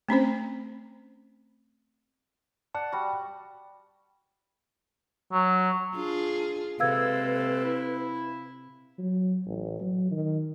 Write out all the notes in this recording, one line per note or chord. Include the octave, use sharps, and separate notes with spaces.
A3 C4 C#4 C5
D5 F#5 A5
G3 F#4
F#3
D4 F4 G#4
C3 G#3 A#3 A4 B4 F5 E6 G#6
E4
F#3
A1
F#3
D#3